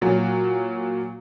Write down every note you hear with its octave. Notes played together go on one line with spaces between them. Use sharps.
A#2 F#3